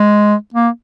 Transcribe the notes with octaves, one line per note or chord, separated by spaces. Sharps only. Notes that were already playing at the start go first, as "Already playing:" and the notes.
Already playing: G#3
A#3